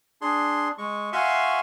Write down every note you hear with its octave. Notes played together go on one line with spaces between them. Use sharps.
D4 G#4 C6
G#3 C#6
F#4 E5 F5 G#5 C6 C#6